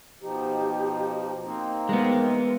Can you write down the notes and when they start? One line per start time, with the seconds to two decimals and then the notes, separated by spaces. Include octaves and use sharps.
0.21 B2 F3 D#4 G4
1.43 A#3 C4 D#4
1.89 G#3 B3 A#4